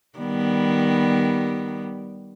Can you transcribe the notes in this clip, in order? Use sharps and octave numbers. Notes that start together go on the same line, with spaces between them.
D#3 G3 B3